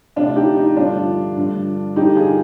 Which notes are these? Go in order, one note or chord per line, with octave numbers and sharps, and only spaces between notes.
D2 C3 F3 D4 F4
D#4 G4
D#4
G2 D3 F3 D4 F4
G2 D3 F3
G2 D3 F3 D#4 G4
F4 G#4